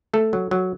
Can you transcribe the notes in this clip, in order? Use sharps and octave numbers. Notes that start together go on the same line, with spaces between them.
A3 A4
F#3
F#3